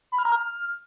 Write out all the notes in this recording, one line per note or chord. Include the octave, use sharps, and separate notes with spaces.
B5
F6
A#5
F6